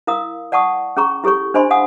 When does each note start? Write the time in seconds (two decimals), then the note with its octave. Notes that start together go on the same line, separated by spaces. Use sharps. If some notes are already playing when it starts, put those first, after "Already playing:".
0.07 E4 A#4 F5 D#6
0.52 D5 F#5 A5 C#6 D#6
0.97 C#4 G#4 A#5 C#6
1.24 E4 G4 A4 C#5 C#6
1.54 D4 C5 D#5 G#5 B5 C6
1.70 F5 F#5 G#5 D#6